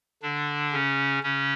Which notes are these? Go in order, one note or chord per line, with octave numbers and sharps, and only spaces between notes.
D3 D4
C#3 C#4
C#3 C#4